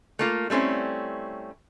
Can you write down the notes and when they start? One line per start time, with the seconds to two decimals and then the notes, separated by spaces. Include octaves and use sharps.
0.19 A3 A#3 F4
0.50 G3 A3 C4 C#4 E4